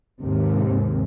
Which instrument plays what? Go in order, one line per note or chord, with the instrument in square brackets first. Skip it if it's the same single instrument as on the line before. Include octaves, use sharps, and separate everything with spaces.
[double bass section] D#2 G#2 C3